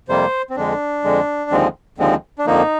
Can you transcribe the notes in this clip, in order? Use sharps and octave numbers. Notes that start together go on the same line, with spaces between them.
F2 C3 G3 A#3 C5
C4
F2 D3 G#3 D4
F2 D3 G#3
D#2 D3 F3 G#3 C4
D#2 D3 F3 G#3 C4
D4
F2 D3 F3 A#3 D#4